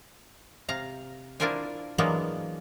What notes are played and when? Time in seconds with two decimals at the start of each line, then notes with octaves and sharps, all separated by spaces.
0.69 C3 F5 A#5
1.40 D4 E4 F4 A#4 C5 G#5
1.98 E3 F#3 G#3 A#3 B3 D4